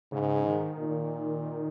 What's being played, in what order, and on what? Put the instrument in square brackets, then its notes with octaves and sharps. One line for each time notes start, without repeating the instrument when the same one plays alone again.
[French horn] G#2 [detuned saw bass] C#3
[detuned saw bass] D#3
[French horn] A#2